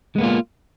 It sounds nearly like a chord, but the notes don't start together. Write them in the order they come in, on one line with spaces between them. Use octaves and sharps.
G#3 B3 A#3 F4